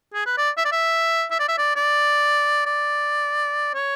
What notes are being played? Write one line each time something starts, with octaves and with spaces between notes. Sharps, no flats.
G#4
B4
D5
E5
D5
E5
E5
D5
E5
D5
D5
D5
C#5